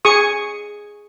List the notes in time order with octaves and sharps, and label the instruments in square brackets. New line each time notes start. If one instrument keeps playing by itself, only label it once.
[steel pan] G#4 C#6 D#6